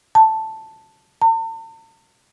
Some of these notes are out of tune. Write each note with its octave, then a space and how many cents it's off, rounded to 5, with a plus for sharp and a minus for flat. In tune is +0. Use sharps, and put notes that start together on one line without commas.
A5 +0
A5 +45